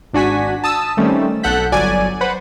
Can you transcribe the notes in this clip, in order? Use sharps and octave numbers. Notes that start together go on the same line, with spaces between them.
G#1 D4 F#4 G#5 B6
A5 D#6 E6
D#3 G3 A3 C4 C#4
B1 A4 F#5 F#6 G6 B6
G1 F#3 D5 G#5
B4 C5 F#5 B5